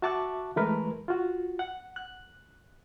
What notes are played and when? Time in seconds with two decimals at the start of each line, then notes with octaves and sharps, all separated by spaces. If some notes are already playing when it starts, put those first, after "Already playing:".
0.02 F#4 E5 A5 C#6 D6 F#6
0.56 E3 G#3 A3 A#4 B4
1.08 F4 F#4
1.59 F#5
1.96 F#6